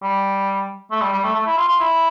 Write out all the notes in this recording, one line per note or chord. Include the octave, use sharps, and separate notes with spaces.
G3
A3
G3
G3
A3
A3
E4
F4
F4
E4